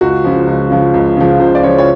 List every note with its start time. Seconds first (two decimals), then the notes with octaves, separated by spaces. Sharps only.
0.01 C#2 F#4
0.24 C#3 F3
0.47 C#2
0.71 C#3 F3
0.94 C#2
1.17 C#3 F3
1.40 C#2 C5
1.55 D5
1.63 C#3 C#5
1.67 F3
1.78 C#5